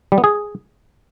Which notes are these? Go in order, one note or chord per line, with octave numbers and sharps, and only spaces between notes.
G3
B3
G#4